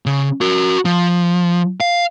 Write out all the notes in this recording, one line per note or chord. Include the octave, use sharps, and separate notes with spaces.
C#3
F#4 A#4
F3
F5